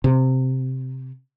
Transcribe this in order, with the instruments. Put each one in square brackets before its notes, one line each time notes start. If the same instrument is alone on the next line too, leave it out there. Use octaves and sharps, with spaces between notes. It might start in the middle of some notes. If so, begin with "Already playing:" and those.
[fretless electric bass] C3